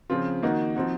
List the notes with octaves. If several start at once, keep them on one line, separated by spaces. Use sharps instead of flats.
C#3 F3 C4 F4
D#3 A#3 D#4 F#4
F3 C4 D#4 F#4